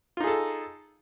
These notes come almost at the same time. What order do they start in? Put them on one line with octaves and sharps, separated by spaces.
F4 D#4 G#4 A4